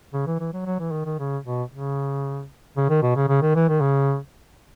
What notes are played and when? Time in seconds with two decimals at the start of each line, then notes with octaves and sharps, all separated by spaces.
0.13 C#3
0.27 E3
0.40 E3
0.53 F#3
0.66 F#3
0.80 E3
0.92 D#3
1.06 D#3
1.19 C#3
1.45 B2
1.72 C#3
2.77 C#3
2.89 D#3
3.02 B2
3.16 C#3
3.28 C#3
3.42 D#3
3.55 E3
3.69 D#3
3.81 C#3